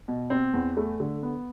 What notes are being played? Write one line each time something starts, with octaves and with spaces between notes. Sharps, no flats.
B2
C4
E2
A3
D3
B3